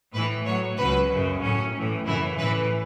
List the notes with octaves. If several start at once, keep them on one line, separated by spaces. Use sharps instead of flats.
A2 E3 B4
A2 F#3 C#5
C#2 C#3 F#3 B4
F#2 C#3 F#3
A2 F#3 C#4
A2 E3
F#2 C#3 E3 E4
A2 E3 B4